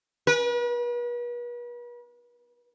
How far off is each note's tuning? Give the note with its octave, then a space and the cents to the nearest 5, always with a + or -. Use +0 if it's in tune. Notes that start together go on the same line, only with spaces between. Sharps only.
B4 -40